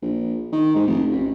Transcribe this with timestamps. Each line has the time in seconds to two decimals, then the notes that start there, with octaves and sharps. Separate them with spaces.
0.02 A#1
0.52 D#3
0.75 G#2
0.87 F1
1.11 A1